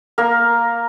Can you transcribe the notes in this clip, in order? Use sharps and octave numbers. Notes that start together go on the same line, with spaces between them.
A#3 A#4